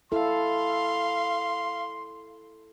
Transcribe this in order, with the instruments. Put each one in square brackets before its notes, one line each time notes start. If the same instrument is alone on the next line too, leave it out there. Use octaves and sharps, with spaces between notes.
[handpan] E4 A4 [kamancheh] F5 [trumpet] C6